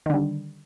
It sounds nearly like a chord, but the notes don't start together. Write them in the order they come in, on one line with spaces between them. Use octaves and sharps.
D#3 D3 G3